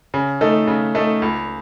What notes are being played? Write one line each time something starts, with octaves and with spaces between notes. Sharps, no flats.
C#3
A3 D#4 A4
C#3
A3 D#4 A4
C#2